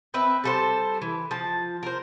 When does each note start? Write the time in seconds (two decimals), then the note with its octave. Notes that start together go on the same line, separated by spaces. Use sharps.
0.14 C4 B4 E5
0.44 G3 A4 C5
1.02 E3
1.31 F3 A5
1.83 A#4 C5